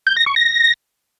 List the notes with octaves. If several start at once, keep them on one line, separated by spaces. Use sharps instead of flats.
G6
A#6
C#6
A#6